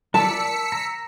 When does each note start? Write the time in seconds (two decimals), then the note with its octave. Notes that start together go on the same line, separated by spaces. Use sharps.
0.14 A#4 D5 A5 E6 B6 C#7
0.72 A#5